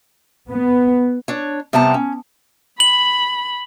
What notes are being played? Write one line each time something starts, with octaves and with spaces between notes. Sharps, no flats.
B3
D4 C#5
C3 G3 B3 G5 A5 A#5
C#4
B5 F#7